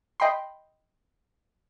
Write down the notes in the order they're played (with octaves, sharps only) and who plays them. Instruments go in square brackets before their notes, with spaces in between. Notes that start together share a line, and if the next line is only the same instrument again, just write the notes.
[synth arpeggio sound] D#5 G5 B5 C6